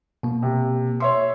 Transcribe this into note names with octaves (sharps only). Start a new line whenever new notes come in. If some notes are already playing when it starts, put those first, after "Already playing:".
B2 A#3
C3
C#5 E5 C6